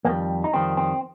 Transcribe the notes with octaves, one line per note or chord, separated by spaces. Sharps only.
F2 D#3 G3 A#3
D#4
F2 D#3 G3 C4
C4